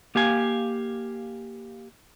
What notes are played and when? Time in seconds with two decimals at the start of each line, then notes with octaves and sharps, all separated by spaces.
0.15 A#3 G4 F5 G#5